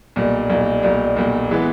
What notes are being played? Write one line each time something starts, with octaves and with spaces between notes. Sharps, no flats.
B1 A#2 G3
B1 A#2 G3
B1 A#2 G3
B1 A#2 G3
E3 G#3 B3